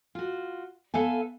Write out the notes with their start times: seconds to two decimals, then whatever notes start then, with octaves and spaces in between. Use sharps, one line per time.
0.15 F4 F#4
0.94 B3 A4 E5 F5 G#5